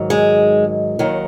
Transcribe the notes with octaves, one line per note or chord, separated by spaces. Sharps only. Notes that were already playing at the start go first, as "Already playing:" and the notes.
Already playing: G#2 D#3 F#3
G#3
D#2 D#3 F#3